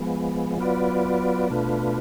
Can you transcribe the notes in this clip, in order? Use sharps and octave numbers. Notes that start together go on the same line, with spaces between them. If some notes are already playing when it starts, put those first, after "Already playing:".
Already playing: F3 G#3 B3
F#3 B3 F4 B4 D5
B2 A3 D4 F4 B4